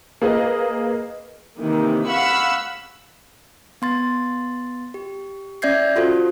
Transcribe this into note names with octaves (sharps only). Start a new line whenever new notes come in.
A#3 G#4 B4 D#5
C3 D#3 E3 A#3
F5 F#5 B5 C#6 E6 F#6
B3 C6 A6
G4
C#4 D5 E5 G6 G#6 C7
F4 F#4 A4 C5